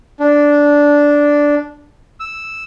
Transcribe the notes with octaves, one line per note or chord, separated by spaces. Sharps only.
D4
E6